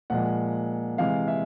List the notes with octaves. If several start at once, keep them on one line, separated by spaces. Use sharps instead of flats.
A#2 F3 G#3 F#5
C3 E3 G#3 F5
E5